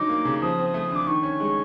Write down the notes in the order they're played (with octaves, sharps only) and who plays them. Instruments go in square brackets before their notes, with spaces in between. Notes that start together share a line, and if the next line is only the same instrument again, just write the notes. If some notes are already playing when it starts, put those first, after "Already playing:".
Already playing: [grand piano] D3 F#3 D#4 [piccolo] D6
[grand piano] A#3
C#3
[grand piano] F3 [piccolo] D#6
[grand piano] C4
A3
D3
[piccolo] D6
[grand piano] D#3 [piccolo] C#6
[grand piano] C#4
G#3